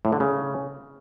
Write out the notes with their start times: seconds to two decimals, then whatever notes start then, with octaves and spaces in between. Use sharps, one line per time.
0.05 A2
0.12 D3
0.20 C#3